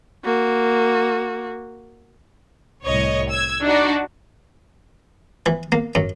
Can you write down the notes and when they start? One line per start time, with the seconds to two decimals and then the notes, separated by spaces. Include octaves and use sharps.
0.25 A#3 F#4
2.85 C2 A2 C#5 D#5
3.30 E6 G#6
3.63 D4 D#4 F#4
5.46 E3
5.72 A#3
5.95 F#2